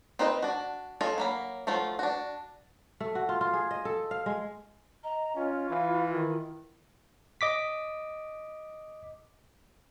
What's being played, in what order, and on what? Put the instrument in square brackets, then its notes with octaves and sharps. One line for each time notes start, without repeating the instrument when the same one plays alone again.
[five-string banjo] C4 D#4 B4 C5 D#5
D4 F#4
F4 G#4 A4 C#5 D#5
F#3 A#3 B5
F3 F#3 A3 F4
D4 F#4
[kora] A3
F#4
F4
F4
G#4
D#5
A4
F5
G#3
[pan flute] D#5 [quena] A#5
[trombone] C#4 [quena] F4
[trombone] E3 [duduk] E4 [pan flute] F5
[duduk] D#3 [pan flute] E4
[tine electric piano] D#5 D6 B6